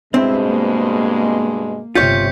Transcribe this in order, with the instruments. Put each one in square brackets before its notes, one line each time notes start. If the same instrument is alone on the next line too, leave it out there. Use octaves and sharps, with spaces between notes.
[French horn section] G2 B2 G#3 [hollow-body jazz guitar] C4 [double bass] E4
[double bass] A#3
[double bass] G1 C3 [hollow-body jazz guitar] F4 C#5 [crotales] G6 B6 C#7